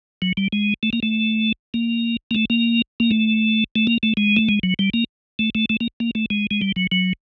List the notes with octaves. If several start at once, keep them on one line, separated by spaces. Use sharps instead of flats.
F#3
G3
G#3
A3
A#3
A3
A#3
A#3
A3
A#3
A#3
A3
A3
A#3
A3
G#3
A3
G#3
F#3
G3
A#3
A3
A3
A3
A#3
A#3
A3
G#3
G#3
G3
F#3
F#3